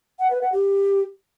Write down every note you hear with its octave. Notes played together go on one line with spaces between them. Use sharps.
F#5
B4
F#5
G4